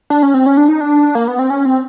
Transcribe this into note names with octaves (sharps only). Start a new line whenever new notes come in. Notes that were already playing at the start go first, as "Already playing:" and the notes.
D4
C#4
C4
C#4
D4
D#4
D4
A#3
B3
C4
C#4
C4